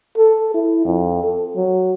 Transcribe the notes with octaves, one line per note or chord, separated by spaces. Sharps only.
A4
E4
F2
A4
F#3